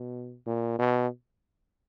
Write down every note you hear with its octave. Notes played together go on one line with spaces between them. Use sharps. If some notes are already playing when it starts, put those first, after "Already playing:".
Already playing: B2
A#2
B2